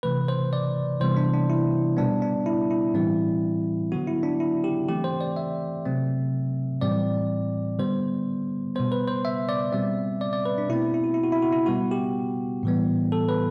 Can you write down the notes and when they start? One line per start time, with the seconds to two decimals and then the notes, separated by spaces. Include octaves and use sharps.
0.03 C3 E3 A3 B4
0.28 C5
0.53 D5
1.00 C3 E3 G3 B3 C5
1.17 D4
1.33 D4
1.50 E4
1.97 B2 G3 B3 D4
2.22 D4
2.46 E4
2.71 E4
2.94 A2 E3 G3 C4
3.92 D3 F#3 B3 F#4
4.07 E4
4.23 D4
4.40 E4
4.64 G4
4.88 E3 A3 C4 G4
5.04 C5
5.21 D5
5.36 E5
5.85 C3 F#3 A3 C4
6.81 A2 E3 G3 C4 D5
7.79 D3 G3 B3 C5
8.75 B2 G3 B3 C5
8.92 B4
9.08 C5
9.25 E5
9.49 D5
9.72 B2 G3 C4 E5
10.21 D5
10.33 D5
10.45 B4
10.58 D4
10.69 B2 A3 C4 E4
10.94 E4
11.04 F#4
11.14 E4
11.23 F#4
11.32 E4
11.42 F#4
11.53 E4
11.66 B2 G3 B3 F#4
11.91 G4
12.63 A2 E3 G3 B3
13.12 A4
13.29 B4